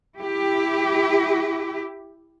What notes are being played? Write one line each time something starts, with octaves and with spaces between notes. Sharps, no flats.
E4 G4